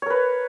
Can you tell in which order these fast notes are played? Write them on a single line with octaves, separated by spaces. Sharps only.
C#5 A#4 B4